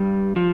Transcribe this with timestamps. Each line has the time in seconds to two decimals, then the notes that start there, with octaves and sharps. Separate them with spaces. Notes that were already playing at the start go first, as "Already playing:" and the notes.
Already playing: G2 G3
0.36 F3